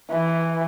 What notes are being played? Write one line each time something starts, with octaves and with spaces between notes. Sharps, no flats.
E3